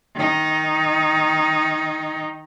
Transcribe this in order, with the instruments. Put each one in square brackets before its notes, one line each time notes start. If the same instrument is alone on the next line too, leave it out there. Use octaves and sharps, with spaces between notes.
[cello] D#3 D#4